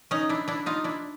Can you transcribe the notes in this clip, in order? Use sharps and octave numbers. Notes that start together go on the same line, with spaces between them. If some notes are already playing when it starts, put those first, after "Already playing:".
C#4 D#4
D4 E4
D4 E4
D#4 F4
D4 E4